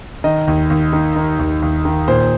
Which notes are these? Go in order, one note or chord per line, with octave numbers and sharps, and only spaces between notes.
D#3 D#5
D#2
D#2
D#3
D#3
D#2
D#2
D#3
A#2 C5